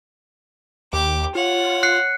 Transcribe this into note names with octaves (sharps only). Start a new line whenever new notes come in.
D#2 G4 D6
F4 C#5 F#5
F#6 C7 C#7